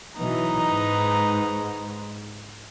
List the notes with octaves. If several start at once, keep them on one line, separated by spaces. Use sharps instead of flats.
B2 E3 F#3 D#4 B4 A#5
G#2